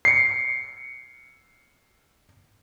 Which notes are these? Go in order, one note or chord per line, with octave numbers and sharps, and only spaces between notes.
C7 C#7